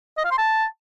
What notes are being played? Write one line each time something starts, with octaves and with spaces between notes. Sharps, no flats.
D#5
F5
C6
A5